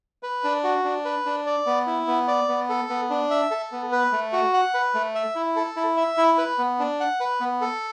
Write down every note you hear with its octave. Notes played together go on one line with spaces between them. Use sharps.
B4
D4
F#4
D4
B4
D4
D5
B3
E4
B3
D5
B3
A4
B3
D4
E5
A4
B3
B4
A3
F#4
F#5
B4
A3
E5
E4
A4
E4
E5
E4
B4
B3
D4
F#5
B4
B3
A4